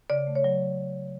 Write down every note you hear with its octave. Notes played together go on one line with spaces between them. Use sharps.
C#3 D5
A3
C#5
F#3